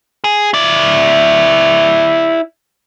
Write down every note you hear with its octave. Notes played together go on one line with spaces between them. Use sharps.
G#4
E4 D5